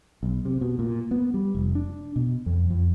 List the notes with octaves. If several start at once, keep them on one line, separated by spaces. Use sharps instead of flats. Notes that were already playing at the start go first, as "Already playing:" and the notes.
B1
C3
B2
A#2
B3
G3
F1
D4
B2
F2
F2